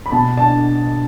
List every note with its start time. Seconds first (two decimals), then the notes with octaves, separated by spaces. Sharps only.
0.06 B5
0.12 B2 A5
0.38 D4 A5